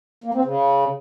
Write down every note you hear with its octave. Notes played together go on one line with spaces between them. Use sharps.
A#3
C4
C#3